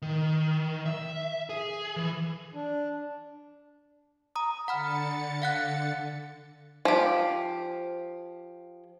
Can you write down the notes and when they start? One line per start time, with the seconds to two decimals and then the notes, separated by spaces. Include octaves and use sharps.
0.02 D#3
0.86 E5
1.49 G#4
1.97 E3
2.54 D4
4.35 A#5 D#6
4.68 D3 F#5 B5 F6 A6 C#7
5.42 F5 F#5 F#6
6.85 F3 G4